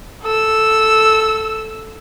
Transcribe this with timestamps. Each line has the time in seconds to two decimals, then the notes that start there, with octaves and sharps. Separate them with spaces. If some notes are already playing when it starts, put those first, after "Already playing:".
0.23 A4 E6